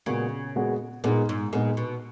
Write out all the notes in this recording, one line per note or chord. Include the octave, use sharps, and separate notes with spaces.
A#2 C#3 G#3 B3 F#4
A#2 G#3 B3 F#4
A#2 G#3 B3 D#4 G#4
G#2
A#2 G#3 B3 D#4 G#4
B2